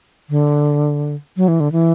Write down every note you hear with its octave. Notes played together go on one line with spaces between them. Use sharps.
D3
F#3
E3
D3
E3